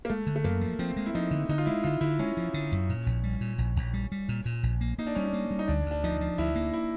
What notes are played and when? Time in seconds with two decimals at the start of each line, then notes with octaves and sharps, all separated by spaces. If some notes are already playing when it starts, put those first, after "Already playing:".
0.05 A#3
0.09 G#3 A3
0.27 D3
0.36 A3
0.44 F#2 A#3
0.61 F3
0.79 F3 C4
0.97 G#3
1.06 E4
1.15 F3 D#4
1.31 D3
1.49 D3 D#4
1.58 F4
1.66 G#3 E4
1.84 D3 F4
2.01 D3 E4
2.19 G#3 C#4
2.37 F3
2.54 D3
2.72 F#2
2.89 A#2
3.06 A#1
3.24 G3
3.41 A#2
3.58 A#1
3.76 A#1
3.94 G3
4.12 G3
4.29 A#2
4.45 A#2
4.63 A#1
4.81 A#3
4.99 A#3 D#4
5.07 D4
5.15 G3 C#4
5.25 D4
5.33 A#3
5.51 G3
5.59 D#4
5.68 D2 D4
5.86 D2
5.91 D4
6.04 F3 D#4
6.21 F3
6.38 D2 E4
6.55 A#3
6.74 E4